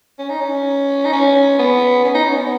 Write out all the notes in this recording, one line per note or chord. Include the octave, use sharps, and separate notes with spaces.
C#4
D#4
C#4
D#4
C#4
B3
C#4
D#4
C#4
B3